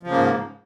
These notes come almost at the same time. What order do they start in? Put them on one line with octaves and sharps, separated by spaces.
F3 C#3 A#3 G#2